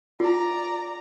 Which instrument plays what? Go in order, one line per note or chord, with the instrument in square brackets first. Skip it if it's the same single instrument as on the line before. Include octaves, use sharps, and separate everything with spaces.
[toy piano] F4 [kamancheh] D5 A#5